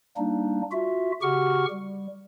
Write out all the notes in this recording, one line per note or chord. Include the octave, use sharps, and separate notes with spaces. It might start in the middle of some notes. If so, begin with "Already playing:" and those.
G3 A#3 D4 D#4
F4 F#4 E5
C#3 F#4 G4 F#5 C#6 F6
G3